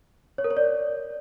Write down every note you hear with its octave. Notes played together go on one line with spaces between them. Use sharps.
C#5
A#4
C#5
D5